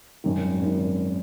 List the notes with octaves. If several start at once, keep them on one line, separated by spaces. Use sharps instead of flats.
G#1 F#2 D#3
G#1 F#2 D#3